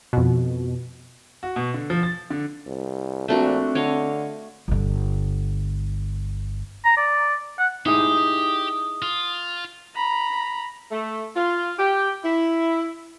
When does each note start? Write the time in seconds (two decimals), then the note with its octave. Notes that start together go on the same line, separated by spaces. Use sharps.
0.13 F2 B2
1.43 F#4
1.56 B2
1.74 D3
1.90 F3
2.03 A6
2.30 D3
2.67 C2
3.28 A#1 A3 C4 D4 F#4
3.75 D3 C#5 D#5 F5
4.68 G1 D3
6.85 A#5
6.97 D5
7.59 F#5
7.86 D#4 E4 G4 G#4 D#6
9.02 F4
9.95 A#5 B5
10.92 A3
11.36 F4
11.79 G4
12.24 E4